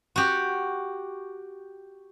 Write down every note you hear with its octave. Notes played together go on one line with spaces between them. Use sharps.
F#4 G4